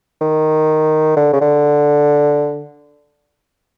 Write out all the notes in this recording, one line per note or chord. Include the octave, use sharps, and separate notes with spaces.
D#3
D3
C#3
D3